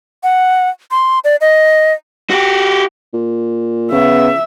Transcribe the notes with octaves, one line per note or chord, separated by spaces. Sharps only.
F#5
C6
D5
D#5
F#4 G4
A#2
C#3 B3 E5